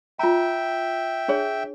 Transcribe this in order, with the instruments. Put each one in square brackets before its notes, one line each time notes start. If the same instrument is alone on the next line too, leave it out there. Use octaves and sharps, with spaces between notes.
[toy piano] F4 A#5 [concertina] E5 G5
[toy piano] D4 G#4 C#5